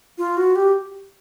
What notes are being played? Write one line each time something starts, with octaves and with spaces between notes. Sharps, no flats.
F4
F#4
G4